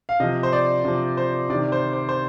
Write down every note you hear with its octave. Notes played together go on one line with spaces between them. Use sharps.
F5
C3 F3 D#5
C5
D5
C3 F3
C5
C3 D#3 D5
C5
C5
C5